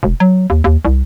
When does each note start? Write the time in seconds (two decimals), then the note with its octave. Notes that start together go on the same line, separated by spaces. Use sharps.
0.03 E1
0.20 F#3
0.50 D#2
0.64 D#2
0.85 C2